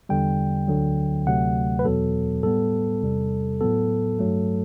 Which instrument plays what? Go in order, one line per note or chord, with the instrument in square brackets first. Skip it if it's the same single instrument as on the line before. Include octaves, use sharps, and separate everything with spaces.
[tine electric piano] E2 D3 G3 G5
D2 D3 F#3
D2 C3 F#3 A3 F#5
B4
E2 B2 F#3 B3 A4
A2 G3 B3 A4
E2 C3 G3
A2 F#3 B3 A4
G2 F#3 A3